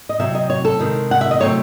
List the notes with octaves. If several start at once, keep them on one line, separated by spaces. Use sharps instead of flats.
D#5
C3 F#3 C4 E5
D#5
C#5
A4
C3 D#3 G#3
F#5
E5
D#5
C3 F#3 A3 C4 C#5